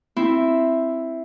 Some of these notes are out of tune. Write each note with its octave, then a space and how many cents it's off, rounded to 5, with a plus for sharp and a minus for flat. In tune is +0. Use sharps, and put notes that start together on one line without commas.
C4 +0 E4 +0